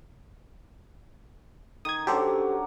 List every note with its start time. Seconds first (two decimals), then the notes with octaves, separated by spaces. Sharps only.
1.85 D#3 D#6 G#6
2.07 F#3 C#4 D4 G4 A4 C5